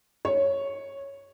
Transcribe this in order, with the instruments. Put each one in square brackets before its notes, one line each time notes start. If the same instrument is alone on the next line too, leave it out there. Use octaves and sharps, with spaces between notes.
[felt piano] C#5